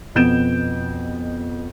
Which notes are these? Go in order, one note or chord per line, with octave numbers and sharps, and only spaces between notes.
F2 B2 B3 G6 D7 E7